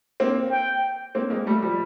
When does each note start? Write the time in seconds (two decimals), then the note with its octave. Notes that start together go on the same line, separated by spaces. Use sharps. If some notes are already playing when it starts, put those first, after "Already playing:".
0.20 A#3 C4
0.51 G5
1.15 A#3 C4
1.30 G#3 A#3
1.47 G3 A3
1.63 F3 G3